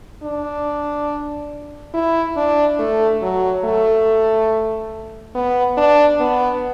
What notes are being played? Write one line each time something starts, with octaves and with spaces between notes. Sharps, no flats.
D4
E4
D4
A3
F#3
A3
B3
D4
B3